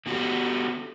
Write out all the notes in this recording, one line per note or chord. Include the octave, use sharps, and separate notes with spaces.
D3 B3 F#4 G4 A4